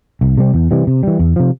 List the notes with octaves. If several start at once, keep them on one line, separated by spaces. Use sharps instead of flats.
C2
C3 G3 C4
E2
C3 E3 G3
C3
E3 G3
E2
C3 F3